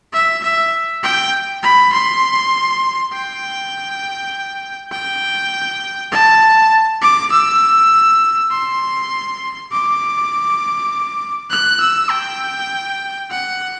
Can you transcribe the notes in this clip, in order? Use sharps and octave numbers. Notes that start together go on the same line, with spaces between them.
E5
E5
G5
B5
C6
G5
G5
A5
D6
E6
C6
D6
F#6
E6
G5
F#5